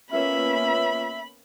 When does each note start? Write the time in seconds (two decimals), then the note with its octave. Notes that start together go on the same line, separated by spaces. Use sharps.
0.12 A#3 B3 C#4 F4 B4 C#5 E5 B5